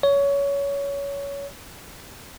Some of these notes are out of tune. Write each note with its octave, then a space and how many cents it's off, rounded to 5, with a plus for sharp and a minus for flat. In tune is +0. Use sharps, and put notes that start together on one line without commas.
C#5 +20